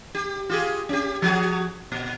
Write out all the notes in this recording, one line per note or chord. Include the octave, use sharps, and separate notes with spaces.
G4
F4 G4 G#4
C#4 G4
F3 F#4 G#4
A#2